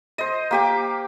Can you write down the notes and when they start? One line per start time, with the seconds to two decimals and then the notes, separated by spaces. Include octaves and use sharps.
0.18 C5 D#5
0.51 A#3 G4 D6